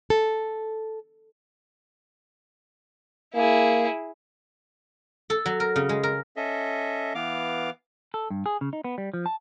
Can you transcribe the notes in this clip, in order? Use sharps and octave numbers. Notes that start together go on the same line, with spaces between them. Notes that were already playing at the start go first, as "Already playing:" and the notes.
A4
A#3 E4 G#4
A4
F#3
A#4
C#3
G#3
A#4
C#4 A4 D#5 E5
E3 B3 F5 D6
A4
G2
G#4
C#3
D#4
B3
G3
F3
A5